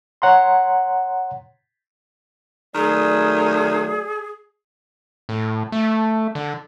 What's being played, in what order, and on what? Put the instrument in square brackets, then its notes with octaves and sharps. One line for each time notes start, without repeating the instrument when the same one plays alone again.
[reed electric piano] C#5 F#5 A#5 C6
[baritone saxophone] D#3 [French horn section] F#3 A3 D5 [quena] G#4
[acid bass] A2
A3
D3